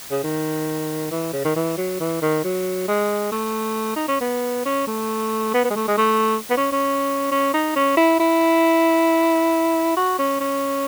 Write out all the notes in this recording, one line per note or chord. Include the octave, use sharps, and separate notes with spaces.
C#3
D#3
E3
C#3
D#3
E3
F#3
E3
D#3
F#3
G#3
A3
D#4
C#4
B3
C#4
A3
B3
B3
G#3
A3
G#3
A3
B3
C#4
C#4
C#4
D#4
C#4
E4
E4
F#4
C#4
C#4